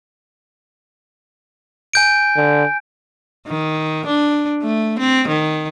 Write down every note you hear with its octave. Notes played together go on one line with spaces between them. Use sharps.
G#5 G6 D7
D3
D#3
D4
A3
C4
D#3